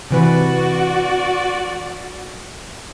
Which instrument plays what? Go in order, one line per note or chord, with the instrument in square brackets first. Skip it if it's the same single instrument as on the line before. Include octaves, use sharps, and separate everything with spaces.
[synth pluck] C3 E3 B4 [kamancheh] F#4 D5